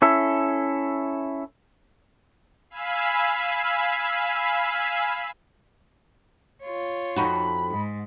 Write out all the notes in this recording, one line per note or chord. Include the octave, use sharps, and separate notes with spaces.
C#4 E4 A4
F5 G#5 B5 E6 B6 C7
F4 C#5
F2 D#4 F#4 B5
G#2